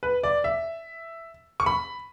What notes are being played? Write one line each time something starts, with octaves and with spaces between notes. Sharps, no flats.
B4
D5
E5
C#6
B5